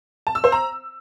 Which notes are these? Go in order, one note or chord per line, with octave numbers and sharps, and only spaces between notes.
A5
E6
C5
A#5